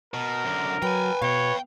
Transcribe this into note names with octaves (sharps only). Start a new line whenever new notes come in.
B2 A#4
F#2 D3
F#3 B4 G5 G#5
B2 C#5 F5 G5